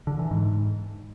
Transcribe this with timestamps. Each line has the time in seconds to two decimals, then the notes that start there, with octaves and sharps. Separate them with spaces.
0.07 D3
0.19 E3
0.31 G#2